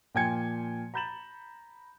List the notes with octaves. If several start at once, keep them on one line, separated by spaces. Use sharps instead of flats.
A#2 F3 G5 G#5 G#6 C#7
A#5 B5 G6 A6 E7 F#7